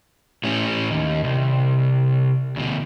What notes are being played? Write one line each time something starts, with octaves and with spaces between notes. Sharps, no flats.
A2 C#4
D#2
C2
D2 B2